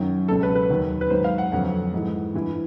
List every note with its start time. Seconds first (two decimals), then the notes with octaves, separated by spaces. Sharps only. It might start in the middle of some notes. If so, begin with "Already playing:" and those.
Already playing: F#2 D#3 F#3
0.28 C#2 B2 F#3 A4
0.43 B4
0.55 B4
0.70 D#2 D#3 F#3
1.01 B4
1.10 G#2 D#3 F#3 C5
1.24 F5
1.38 F#5
1.52 F2 D3 F#3 F#5
1.94 G#2 E3
2.34 G2 E3